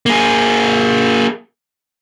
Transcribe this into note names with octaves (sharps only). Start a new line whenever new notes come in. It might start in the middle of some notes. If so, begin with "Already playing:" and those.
A#3 G#4